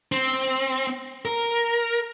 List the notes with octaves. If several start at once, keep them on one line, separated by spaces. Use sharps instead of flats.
C4
A#4